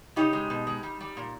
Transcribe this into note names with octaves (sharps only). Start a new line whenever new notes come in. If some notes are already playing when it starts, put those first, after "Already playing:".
C#3 D#4 G4
G#3
B2
G#3
G3
G3
A#2